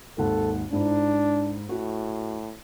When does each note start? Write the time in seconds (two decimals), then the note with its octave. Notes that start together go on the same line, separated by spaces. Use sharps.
0.18 G#1 D#2 A4 F#5
0.73 G#2 D4 E4
1.69 A2 F#4